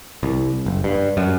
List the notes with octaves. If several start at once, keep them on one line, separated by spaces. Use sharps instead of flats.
C2
F#1
G2
F#2